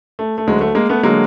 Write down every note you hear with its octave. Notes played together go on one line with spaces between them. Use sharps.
A3
A3
D2 D3 F#3 G#3
A3
G#3 A#3
A3 B3
D3 F#3 G#3 A#3